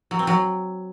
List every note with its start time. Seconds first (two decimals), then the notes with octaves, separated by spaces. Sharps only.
0.11 F#3
0.19 C4
0.27 F#3